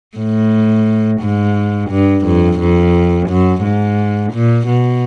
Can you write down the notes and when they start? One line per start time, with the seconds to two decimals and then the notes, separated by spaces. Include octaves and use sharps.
0.18 A2
1.21 G#2
1.90 G2
2.26 F2
2.60 F2
3.29 F#2
3.63 G#2
4.33 A#2
4.67 B2